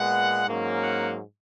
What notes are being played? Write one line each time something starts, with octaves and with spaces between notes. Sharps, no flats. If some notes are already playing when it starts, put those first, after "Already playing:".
Already playing: A#2 G#3 B3 F#5
G#2 F#3 A#3 C#4
F#5